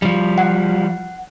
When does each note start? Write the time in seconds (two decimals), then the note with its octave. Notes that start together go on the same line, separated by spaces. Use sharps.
0.02 F3 G3
0.38 F#5